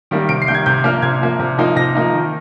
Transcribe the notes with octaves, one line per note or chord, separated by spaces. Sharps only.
D#3 G3 A#3
C3 D7
C7
D#3 G3 A#3 G6
G#6
C3 G6
F3 A#3 D4 F6
C3 G#6
F3 A#3 D4
C3
F3 A#3 D#4
C3 A#6
F3 A#3 D#4
D#3